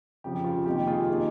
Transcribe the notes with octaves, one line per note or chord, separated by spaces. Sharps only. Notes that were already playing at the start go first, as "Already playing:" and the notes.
F2 C#3 F3 G4
F4
F2 C3 D#3 A#3 G4
F4 G#4
D#3 A#3